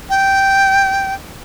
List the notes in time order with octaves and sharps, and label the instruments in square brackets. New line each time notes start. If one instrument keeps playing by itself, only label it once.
[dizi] G5